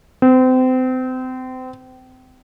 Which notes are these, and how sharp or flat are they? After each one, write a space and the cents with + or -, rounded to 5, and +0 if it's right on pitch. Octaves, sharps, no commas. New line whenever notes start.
C4 -30